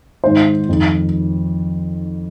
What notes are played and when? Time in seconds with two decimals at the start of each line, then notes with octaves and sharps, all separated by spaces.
0.24 G#2 D#3 C5
0.69 F2 D#3